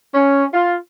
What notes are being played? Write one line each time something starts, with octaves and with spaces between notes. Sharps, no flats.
C#4
F4